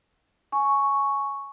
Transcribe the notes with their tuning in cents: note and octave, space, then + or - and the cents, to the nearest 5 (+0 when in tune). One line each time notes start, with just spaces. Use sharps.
G#5 +15 C#6 +0